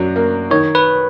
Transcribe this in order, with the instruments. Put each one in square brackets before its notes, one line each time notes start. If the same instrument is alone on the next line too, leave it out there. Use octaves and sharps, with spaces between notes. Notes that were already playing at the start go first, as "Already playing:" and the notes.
Already playing: [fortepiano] F#2 F#3 [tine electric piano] D5
[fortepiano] A#3
[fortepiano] D#3 [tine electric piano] C#5
[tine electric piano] B4